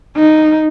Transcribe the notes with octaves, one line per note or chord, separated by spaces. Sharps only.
D#4